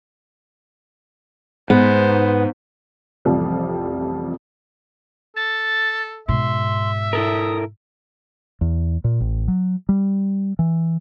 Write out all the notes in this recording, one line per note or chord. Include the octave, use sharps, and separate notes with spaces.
G#2 B3 C5
A1 F2 C3 F3 G3
A4 A6
G#2 B2 E5 C6
E4 A4 A#4 D#6
E2
A#2
A1
F#3
G3
E3